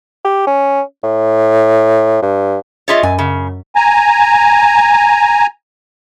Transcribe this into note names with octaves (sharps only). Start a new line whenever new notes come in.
G4
C#4
A2
G2
F4 G#4 C#5 D#5 E5 A6
F#2 G#5
C#3
G#5 A#5